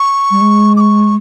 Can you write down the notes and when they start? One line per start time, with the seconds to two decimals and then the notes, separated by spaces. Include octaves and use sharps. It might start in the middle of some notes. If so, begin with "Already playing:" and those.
Already playing: C#6
0.31 G3
0.41 G#3
0.77 D6
0.80 C#6